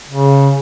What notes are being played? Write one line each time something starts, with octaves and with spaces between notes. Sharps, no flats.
C#3